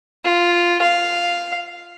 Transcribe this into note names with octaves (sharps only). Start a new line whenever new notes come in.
F4
F5